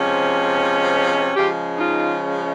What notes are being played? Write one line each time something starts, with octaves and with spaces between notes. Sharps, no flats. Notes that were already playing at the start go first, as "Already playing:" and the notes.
Already playing: C3 F3 G#3 C#4
C#3 F3 G#3 C#4 F4 G4
D#4 F4